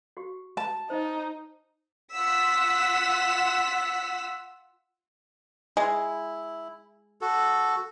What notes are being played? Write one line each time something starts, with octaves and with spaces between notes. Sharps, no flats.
F#4 G4
A5
D#4 C5 D#5
F4 F#5 E6 B6
G#3 E4
F#4 A4